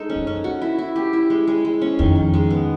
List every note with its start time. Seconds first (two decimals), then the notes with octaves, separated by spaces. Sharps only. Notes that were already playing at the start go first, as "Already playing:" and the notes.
Already playing: G#3 D#4 A4
0.10 C#4
0.15 F#2
0.27 C#4
0.44 F#4
0.62 E4
0.78 E4
0.96 G4
1.13 E4
1.30 G#3
1.47 G#3
1.65 G#3
1.82 C#4
1.99 F2 D#3
2.16 D#3
2.34 G#3
2.50 B3